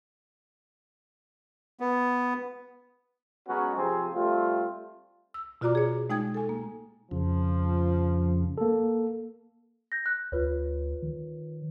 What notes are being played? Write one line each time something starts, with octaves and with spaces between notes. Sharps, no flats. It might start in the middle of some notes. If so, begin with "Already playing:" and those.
B3
F#3 G#3 B3 C#4 F#4
C3 F3 C4 G#4
G3 A3 C4 F4
E6
B2 F4 F#4 D5 A#5 D6
G#4 C#5
G#3 D#4 G5 D#6 G#6
A4 G#5
A#3
F2 C#3 F3
A#3 A4
G6 A#6
F#6
D2 F4 B4 C#5
D#3